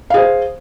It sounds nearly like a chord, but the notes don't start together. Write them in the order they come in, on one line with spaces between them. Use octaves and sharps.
F5 G#4 C5